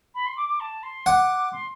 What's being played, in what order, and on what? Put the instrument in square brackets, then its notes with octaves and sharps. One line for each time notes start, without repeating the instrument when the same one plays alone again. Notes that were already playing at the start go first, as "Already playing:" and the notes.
[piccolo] B5
C6
D6
D6
A5
C6
[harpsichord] F#5 [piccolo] D6
[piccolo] C6